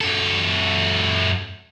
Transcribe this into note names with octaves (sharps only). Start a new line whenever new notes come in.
F#2 A4